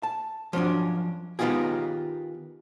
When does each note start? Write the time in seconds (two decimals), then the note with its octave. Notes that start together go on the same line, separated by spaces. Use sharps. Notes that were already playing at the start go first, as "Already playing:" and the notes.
0.03 A5
0.53 F3 F#3 C#4 D4
1.39 D#3 B3 D#4 F4 G4 G#4